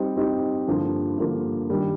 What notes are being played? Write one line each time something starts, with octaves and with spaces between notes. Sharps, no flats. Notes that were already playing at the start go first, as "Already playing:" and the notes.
Already playing: G3 C4 D#4 G4
G3 C4 D#4 G4
G2 D3 F3 A#3
G2 D3 F3 A#3
D#3 G3 D4